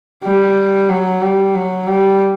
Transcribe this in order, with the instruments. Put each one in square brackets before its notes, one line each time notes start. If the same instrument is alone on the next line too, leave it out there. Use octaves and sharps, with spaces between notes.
[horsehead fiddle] G3
F#3
G3
F#3
G3